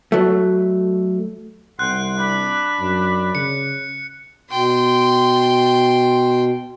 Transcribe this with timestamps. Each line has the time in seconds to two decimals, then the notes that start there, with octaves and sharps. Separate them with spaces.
0.12 F#3 A3
1.79 C2 F#5 G5 C6 F#6
2.17 D4 B5
2.80 F#2
3.35 C#3 C#7
4.51 B2 G5 C6